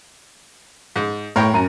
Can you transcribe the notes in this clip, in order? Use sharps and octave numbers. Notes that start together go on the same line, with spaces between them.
G#2
A2 A#4 C#5 G5
F#2 A#5 D#7